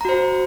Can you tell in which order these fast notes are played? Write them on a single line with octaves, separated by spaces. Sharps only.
A#5 F#4 C5